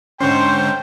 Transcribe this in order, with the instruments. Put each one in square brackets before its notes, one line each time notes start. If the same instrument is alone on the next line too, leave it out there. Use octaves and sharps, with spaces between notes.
[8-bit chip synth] G#2 D3 C#4 [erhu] C5 [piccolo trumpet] G5 [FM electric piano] C6 C#6